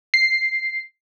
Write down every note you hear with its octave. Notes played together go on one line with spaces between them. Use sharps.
C7